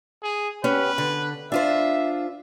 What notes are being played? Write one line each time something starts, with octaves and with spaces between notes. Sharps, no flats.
G#4
B3 C#4 G4 B4
D3
D4 F4 C5 E5